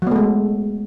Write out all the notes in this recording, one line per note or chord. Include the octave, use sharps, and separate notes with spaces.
F#3 G#3 A3 B3